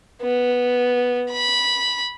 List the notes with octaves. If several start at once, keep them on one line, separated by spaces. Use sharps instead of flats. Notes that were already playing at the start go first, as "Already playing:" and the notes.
B3
B5